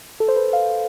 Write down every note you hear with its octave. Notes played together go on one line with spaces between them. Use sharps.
A4
C5
B4
F5